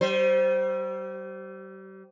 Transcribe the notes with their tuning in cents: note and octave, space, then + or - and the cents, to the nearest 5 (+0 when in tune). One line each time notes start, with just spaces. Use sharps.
G3 -35 C5 +0